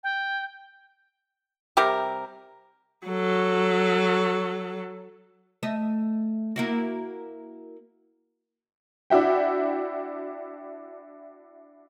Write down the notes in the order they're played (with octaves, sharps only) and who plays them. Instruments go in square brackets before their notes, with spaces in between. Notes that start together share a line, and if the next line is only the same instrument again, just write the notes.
[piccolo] G5
[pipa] C3 G3 G4 A#4
[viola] F#3 A4
[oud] A3 D#5 E5
A#3 E4 F#4
[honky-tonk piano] D4 E4 F#4 E5 G5